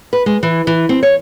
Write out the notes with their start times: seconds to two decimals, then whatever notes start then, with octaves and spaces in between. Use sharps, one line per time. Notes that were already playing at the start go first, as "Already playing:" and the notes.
0.13 B4
0.26 G#3
0.43 E3
0.67 E3
0.89 C4
1.03 C#5